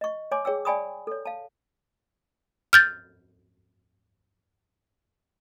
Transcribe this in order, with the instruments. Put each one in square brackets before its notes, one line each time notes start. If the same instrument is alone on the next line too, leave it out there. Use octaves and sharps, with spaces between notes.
[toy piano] D#5 C#6
C#5 G#5 C6 D6
G#4 C#5 G5 E6
D5 G5 G#5 B5 C#6 D#6
A4 C#5
F5 A5
[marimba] F6 G6 A6